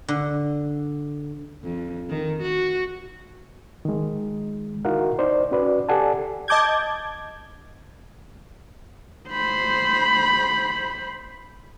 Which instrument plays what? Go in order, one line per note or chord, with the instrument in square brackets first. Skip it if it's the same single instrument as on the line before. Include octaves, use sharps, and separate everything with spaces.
[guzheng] D3
[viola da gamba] F2
D#3
F#4
[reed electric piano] D#3 G#3
D#4 E4 F#4 A#4 F5 F#5
D#4 C5 D5
C#4 F#4 B4 D5
G4 A4 D5 F#5 G#5 A5
[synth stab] D#5 A5 D6 G6 G#6
[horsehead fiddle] C5 B5